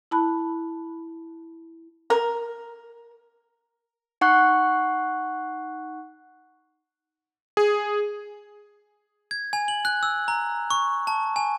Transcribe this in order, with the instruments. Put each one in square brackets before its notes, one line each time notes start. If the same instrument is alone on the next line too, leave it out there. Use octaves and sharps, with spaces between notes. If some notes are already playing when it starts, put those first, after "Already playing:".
[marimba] E4 A5 B5 F#6
[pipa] A#4
[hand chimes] D#4 F#5 C#6 F#6
[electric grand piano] G#4
[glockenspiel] G#6
G#5
F#7
F#6
E6
A#5
C#6
A5
G#5